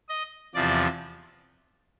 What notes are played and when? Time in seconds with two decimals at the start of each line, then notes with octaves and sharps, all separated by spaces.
0.09 D#5
0.54 E2 C3 F3 D5